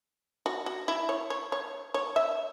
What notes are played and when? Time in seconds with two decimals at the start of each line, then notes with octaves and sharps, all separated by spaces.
0.46 F#4
0.66 F#4
0.88 E4
1.09 C#5
1.30 C#5
1.52 C#5
1.94 C#5
2.16 E5